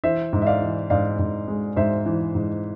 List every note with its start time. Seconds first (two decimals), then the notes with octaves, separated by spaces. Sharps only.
0.04 E3 C5 E5
0.33 G#2
0.42 E5
0.47 D5 F5
0.61 E3
0.90 G#2 D5 F5
1.19 G#2
1.48 G#3
1.76 G#2 C5 E5
2.06 E3
2.35 G#2